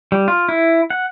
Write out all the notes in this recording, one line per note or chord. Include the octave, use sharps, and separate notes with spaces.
G3
F4
E4
F#5